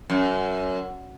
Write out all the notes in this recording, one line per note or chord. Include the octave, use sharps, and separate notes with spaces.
F#2